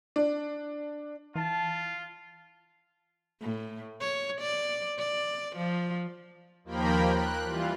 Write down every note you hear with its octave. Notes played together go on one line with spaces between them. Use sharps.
D4
E3 F4 A5
A2
C#5
D5
D5
F3
D#2 F3 A#3 A#4 G5 B5
F#6
E3 G3 F4